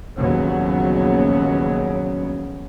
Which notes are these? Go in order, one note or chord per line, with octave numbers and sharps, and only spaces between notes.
A#1 D#2 C#3 F#3 B3 C#4